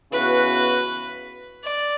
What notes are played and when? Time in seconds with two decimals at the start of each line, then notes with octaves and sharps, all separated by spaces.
0.12 C#3 E3 B3 F#4 B4
1.65 D5